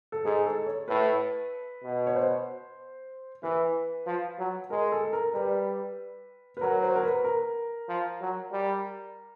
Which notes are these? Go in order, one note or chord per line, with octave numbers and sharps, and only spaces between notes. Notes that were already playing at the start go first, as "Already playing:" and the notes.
A4
G#2 G#4
A4
C#5
A2 B4
B2
C#5
C5
E3 B4
F3
F#3
G#3 A#4
A4
A#4
G3 B4
B4
F#3 A#4
C5
A#4
B4
A#4
F3
F#3
G3